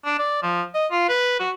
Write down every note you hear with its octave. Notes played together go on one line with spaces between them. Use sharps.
D4
D5
F3
D#5
F4
B4
F#4